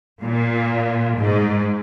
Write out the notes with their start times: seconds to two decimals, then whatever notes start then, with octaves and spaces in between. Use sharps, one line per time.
0.22 A#2
1.18 G#2